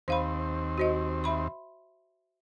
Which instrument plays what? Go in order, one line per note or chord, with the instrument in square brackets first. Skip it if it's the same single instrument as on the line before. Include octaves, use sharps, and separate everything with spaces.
[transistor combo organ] D#2 C4 [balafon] C5 F5 B5
[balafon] F#4 C5 D#5
E5 B5 C6